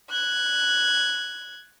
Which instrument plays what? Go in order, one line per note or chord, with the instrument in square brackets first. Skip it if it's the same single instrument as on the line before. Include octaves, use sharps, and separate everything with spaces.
[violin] F#6 G#6